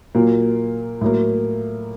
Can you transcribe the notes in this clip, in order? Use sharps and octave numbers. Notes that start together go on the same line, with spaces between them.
A#2 F#3 A#3
A2 F#3 A#3